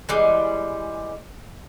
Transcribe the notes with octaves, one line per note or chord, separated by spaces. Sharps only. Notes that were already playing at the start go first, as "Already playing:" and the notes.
E3 G3 G#3